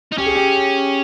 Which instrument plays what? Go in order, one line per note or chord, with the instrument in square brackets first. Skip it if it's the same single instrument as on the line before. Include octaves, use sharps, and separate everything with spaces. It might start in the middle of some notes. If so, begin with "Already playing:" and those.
[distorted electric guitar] D#4
[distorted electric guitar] C#4 [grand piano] G4
[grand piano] G#4
G4